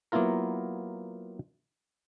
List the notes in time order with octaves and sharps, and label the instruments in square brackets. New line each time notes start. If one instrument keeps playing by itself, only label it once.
[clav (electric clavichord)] F#3 A#3 B3 E4 F4 A#4